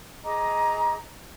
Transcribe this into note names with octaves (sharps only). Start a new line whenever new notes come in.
G#4 D#5 A#5 D6